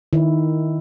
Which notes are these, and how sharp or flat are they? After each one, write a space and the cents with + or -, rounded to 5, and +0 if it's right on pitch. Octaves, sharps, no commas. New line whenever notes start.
D#3 +0 E4 +0